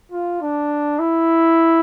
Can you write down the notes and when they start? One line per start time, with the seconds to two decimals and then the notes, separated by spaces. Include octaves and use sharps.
0.12 F4
0.41 D4
0.99 E4